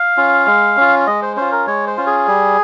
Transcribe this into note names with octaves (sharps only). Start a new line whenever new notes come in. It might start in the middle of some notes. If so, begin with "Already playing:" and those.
Already playing: F5
C#4 F4
G#3
C#4 F4
G#3 D#5
C5
C#4 F4 C5
A#4
G#3 C#5
C5
C#4 F4
G#4
G3